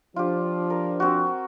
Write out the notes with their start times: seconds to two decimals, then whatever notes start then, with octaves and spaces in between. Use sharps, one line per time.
0.16 F3 D4 F4 G4
0.70 A#4
1.00 C4 F#4